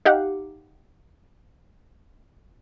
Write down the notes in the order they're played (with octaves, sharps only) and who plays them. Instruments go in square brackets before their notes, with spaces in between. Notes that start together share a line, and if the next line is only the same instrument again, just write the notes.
[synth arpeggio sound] D#4 G4 F5 F#5